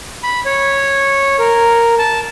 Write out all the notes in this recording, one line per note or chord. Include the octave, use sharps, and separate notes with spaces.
B5
C#5
A#4
A5